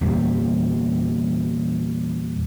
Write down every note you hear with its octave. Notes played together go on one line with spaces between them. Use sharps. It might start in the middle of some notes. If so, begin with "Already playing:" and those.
E2 A#2 G3